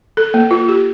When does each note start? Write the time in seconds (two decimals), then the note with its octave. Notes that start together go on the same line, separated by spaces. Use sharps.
0.17 A4
0.34 A#3
0.51 F4
0.68 G4